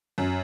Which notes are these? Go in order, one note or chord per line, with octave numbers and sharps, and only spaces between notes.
F#2